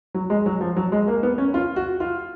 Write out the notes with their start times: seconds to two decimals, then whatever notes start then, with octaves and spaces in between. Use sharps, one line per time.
0.14 F#3
0.30 G#3
0.46 F#3
0.61 F3
0.76 F#3
0.92 G#3
1.08 A#3
1.23 B3
1.38 C#4
1.54 F4
1.76 F#4
2.00 F4